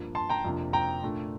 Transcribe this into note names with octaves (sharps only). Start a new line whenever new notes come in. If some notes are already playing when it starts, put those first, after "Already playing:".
Already playing: G2 F3 A#3 D4
A5 C6
G5 A#5
F2 C3 F3 A#3 D4
G5 A#5
A#2 A3 D4